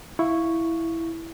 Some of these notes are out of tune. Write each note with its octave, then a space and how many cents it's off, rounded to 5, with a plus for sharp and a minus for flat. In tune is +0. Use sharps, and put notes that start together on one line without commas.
E4 +0 F5 +0 C#6 +0